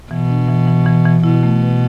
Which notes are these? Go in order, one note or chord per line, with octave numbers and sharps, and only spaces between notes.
B2 E3
D4
E3
E3
E3
E3
B2 E4
A3
B4